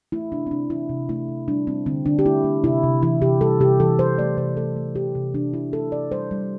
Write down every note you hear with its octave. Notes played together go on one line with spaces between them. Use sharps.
A3 E4
C3 D4
C4
C3 D4
E3 E4
C3
A3 E4
C3
G3 D4
G3 C4
D3 C4
D3 D4
G4
A3 E4
A3
C3 E4
C3
E3 E4
C3 G4
G3 A4
C3 G4
E3 A4
C3 C5
A3 D5
C3 C5
A3 A4
A3
C3 G4
C3
E3 D4
C3 E4
A3 A4
C3 D5
G3 C5
G3